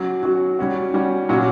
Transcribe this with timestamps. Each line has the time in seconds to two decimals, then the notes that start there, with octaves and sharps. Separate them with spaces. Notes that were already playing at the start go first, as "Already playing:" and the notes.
Already playing: F#3 C#4 F#4
0.23 F#3 C#4 F#4
0.59 G3 C#4 F#4
0.94 G3 C#4 F#4
1.29 A#2 F#3 C#4 F#4